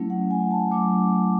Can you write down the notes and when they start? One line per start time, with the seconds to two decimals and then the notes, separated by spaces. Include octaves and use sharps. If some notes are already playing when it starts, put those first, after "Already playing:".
Already playing: F#3 A3 C#4 E4
0.10 F#5
0.31 G#5
0.51 A5
0.71 F#3 A3 C#4 E4 D6